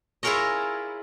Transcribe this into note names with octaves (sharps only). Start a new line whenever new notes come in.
E4 F4 G#4 A#4 C#5 D#5